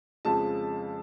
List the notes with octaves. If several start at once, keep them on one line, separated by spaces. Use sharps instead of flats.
F2 C#3 F3 G#3 A5